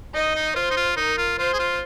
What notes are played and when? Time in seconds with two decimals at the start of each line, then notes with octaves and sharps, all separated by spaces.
0.15 D#4 D#5
0.35 D#4
0.56 F4 C5
0.71 D#4
0.77 F4
0.97 D#4 A#4
1.18 F4
1.39 F4 C5
1.53 G#4
1.59 F4